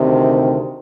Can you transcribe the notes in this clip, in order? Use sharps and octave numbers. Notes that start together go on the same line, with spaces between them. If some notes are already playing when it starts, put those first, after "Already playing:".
Already playing: D2 C3 D#3